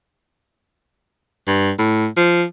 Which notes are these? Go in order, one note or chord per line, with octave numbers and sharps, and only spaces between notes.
G2
A2
F3